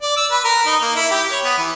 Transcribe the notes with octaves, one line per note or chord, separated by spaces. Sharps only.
D5
E6
B4
A#4
D#4
A#3
E4
G4
C#5
B3
E3